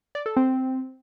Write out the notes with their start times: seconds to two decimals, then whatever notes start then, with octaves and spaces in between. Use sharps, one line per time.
0.15 D5
0.26 A4
0.37 C4